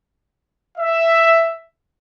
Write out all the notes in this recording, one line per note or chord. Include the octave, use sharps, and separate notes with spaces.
E5